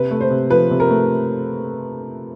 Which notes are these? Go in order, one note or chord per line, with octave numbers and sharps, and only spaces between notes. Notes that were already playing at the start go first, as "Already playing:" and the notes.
Already playing: C3 B4
A3
C5
C3
F3 B4
C3
A#4
A3